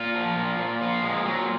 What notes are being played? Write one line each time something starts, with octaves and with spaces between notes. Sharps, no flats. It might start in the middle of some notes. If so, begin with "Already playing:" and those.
Already playing: A#2 F4
F3
A#2
A#2
F3 F4
A#2 G#3
A#2 F#3